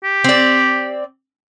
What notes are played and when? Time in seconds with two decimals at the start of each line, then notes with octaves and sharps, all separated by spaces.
0.04 G4
0.24 C4 D5